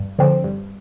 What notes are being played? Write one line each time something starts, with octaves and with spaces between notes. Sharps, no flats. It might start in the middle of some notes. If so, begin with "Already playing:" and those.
Already playing: G2
D3 F3 C4
G2